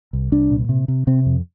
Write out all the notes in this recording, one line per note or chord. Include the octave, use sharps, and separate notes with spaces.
C2
C2 D4
A#2
C3
C3
C3 C4
F2